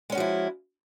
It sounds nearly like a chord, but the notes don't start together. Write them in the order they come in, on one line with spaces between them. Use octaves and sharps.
G#3 C#4 F#4 F3 E4